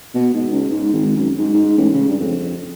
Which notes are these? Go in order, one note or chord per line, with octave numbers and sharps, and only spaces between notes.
B2
G#2
C#2
G#2
G#1
F#2
G#2
G#2
A1
C#3
G2
F2